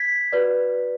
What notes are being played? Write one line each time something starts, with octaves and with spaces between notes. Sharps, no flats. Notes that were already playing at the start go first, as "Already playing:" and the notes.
Already playing: G#6 B6
F#4 B4 D5